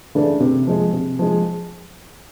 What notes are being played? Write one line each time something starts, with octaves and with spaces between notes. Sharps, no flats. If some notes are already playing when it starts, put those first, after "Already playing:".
C#3 E3 A3 D4
C3
F3 G#3
C3
F3 G#3